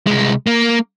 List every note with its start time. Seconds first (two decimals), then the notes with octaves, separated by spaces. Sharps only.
0.07 C2 G#3
0.47 A#3